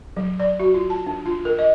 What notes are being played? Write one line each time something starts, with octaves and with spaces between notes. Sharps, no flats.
F#3
D5
F#4
F4
A5
D4
F4
A#4
D#5